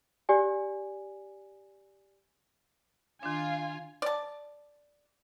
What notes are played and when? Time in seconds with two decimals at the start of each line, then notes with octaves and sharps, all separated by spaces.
0.29 G4 D5 G#5
3.23 D#3 D4 F4 G#5
4.02 D5 A5